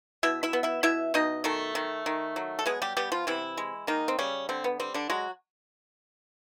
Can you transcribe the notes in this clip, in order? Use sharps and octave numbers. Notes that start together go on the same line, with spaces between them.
B2 E4 E5
E4 E5
B3
E4 E5
B2 E4 E5
B2 D#4 D#5
D#3 A3 A4
D#3
D#3
F#3
A4
G#3 B3 G#4
G3 G4
G3 B3 G4
F3 F4
C3 E3 E4
G#3
D#3 A#3 D#4
C4
C#3 G3 C#4
D3 C4
B3
G3 C4
D3 D4
F#3 G#3 F#4